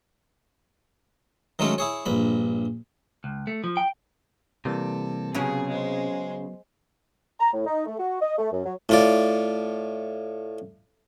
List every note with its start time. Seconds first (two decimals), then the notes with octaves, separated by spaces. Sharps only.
1.59 D#3 F#3 G#3 A3 C#4
1.78 E4 G#4 C#5
2.06 A#1 G2 B5
3.24 C#2
3.47 A3
3.64 F3
3.77 G5
4.65 C3 E3 G3 A#3 A4
5.34 C#3 F#3 B3 C#4 G#4
5.69 G#3 C5
7.40 A#5
7.54 A2
7.67 D#4
7.87 A3
7.99 F#4
8.21 D#5
8.38 A3
8.52 F#2
8.65 F#3
8.89 A2 F4 D5